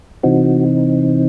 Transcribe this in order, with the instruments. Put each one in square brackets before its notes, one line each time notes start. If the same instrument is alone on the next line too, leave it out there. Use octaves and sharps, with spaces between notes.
[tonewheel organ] C3 E3 C4 D#4 F#4